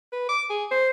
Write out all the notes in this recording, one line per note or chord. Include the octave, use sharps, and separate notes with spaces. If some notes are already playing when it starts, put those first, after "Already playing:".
B4
D6
G#4
C5